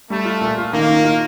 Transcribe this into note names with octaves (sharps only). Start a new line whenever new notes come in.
G3 A3
F4
A#2
F4
D#3 A#3
D#3
F4